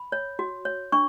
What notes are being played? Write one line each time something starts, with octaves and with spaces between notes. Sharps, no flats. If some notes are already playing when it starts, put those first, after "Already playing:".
Already playing: B5
C#5
F#4
C#5
D4 C#6